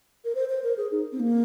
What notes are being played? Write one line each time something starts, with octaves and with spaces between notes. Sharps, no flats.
A#4
C5
C5
A#4
G#4
D#4
C4
A#3